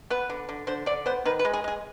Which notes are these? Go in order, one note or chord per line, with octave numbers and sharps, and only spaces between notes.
B3 B4
D3
D3
D3 C5
D3 D5
B3 C5
D#3 B4
B4
G#3
G#4
G#3 G#4